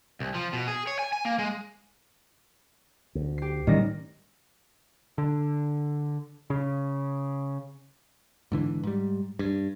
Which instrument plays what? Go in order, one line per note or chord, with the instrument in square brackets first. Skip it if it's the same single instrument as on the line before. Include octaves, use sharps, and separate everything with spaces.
[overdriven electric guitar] C2
F3
B2
G#4
C#5
G#5
G#5
A#3
G#3
[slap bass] D2
[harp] G4 C7
[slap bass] A2 E3 C#4 [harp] D#3 G3 A#6
[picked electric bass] D3
C#3
G#2 D3 E3
G#2 G3
G2